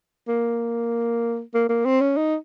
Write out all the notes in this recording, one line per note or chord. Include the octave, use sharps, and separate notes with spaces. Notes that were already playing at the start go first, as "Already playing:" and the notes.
A#3
A#3
A#3
C4
C#4
D#4